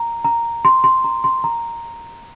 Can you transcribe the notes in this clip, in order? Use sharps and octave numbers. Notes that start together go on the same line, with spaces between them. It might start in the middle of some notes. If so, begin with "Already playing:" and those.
Already playing: A#5
A#5
C6
C6
A#5
C6
A#5